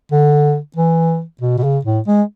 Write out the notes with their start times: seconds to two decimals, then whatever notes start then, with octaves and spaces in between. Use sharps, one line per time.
0.12 D3
0.77 E3
1.41 B2
1.58 B2
1.63 C#3
1.85 A2
2.07 G#3